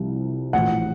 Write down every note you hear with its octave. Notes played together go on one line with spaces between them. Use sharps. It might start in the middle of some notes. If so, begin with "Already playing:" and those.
Already playing: C2 C3 F3
A#1 A2 E3 F#5